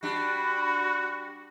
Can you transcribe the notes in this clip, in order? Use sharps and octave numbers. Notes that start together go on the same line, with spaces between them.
G3 D4 F#4 B5